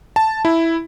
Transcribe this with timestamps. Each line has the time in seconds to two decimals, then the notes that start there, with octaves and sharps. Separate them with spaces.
0.16 A5
0.45 E4